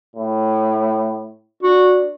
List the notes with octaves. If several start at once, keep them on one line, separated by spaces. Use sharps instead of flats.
A2
D4 F#4